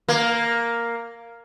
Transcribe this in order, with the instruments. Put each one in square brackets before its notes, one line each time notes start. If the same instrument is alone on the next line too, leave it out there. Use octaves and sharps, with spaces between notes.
[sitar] A#3